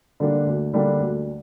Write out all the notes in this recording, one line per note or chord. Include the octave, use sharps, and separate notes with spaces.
D3 G3 A#3 D4
D2
D3 G3 A#3 D4
D2